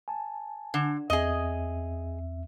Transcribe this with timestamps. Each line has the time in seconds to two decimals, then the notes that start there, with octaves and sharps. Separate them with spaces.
0.08 G#5 A5
0.74 D3
1.10 E2 C4 G#4 D#5 E5